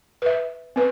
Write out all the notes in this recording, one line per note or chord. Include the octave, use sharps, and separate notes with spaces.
B4 E5
C4 B4